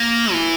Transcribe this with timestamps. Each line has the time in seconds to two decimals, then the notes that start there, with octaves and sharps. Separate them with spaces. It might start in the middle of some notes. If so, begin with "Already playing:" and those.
Already playing: A#3
0.33 E3